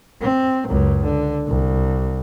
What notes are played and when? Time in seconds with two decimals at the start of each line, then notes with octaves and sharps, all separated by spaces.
0.22 C4
0.68 C#2 F#2
1.03 D3
1.47 C2